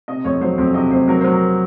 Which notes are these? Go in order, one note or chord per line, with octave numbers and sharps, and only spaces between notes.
C3 D#5
F2 C#5
F#3 C5
F2
C3 D#5
F2 C5
F#3 A#4
F#3 C5
A#4